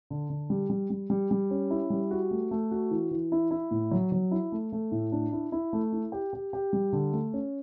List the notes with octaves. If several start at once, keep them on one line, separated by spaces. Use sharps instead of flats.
D3
D3
G3
G3
G3
G3
G3
C#4
E4
G3
F#4
A3
A3
F#4
E3
E3
E4
E4
A2
F#3
F#3
E4
A3
A3
A2
D4
E4
E4
A3
E4
G4
G4
G4
G3
D3
A3
C#4